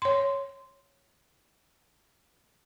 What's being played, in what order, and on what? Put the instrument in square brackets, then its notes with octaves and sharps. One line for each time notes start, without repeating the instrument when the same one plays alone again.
[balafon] C#5 C6